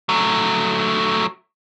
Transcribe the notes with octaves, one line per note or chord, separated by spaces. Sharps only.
F#3 A3